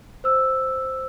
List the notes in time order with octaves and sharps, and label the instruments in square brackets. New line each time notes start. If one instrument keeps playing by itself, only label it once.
[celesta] C5 E6